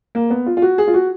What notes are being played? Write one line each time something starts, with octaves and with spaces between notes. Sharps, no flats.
A#3
B3
F4
F4
F#4
G#4
F4
F#4